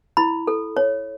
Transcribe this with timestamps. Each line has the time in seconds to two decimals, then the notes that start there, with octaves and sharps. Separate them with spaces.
0.17 E4 B5
0.47 A4
0.77 C#5